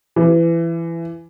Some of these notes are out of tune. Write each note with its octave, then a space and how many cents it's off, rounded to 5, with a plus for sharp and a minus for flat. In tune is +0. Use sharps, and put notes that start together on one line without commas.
E3 +20